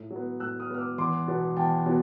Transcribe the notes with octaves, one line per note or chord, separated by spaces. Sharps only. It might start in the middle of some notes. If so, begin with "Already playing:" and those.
Already playing: A2
F#3
B3
A2 E6 F#6
D#6 F6
F#3 B3 F6
D6 E6
E2 C6 D6
B2 F#3 B3
E2 G5 A5
B2 F#3 B3